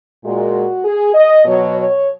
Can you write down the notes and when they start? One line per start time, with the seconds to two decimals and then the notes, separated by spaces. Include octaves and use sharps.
0.23 A#2 G#3 F#4
0.85 G#4
1.14 D#5
1.45 B2 F#3 C#5
1.75 C#5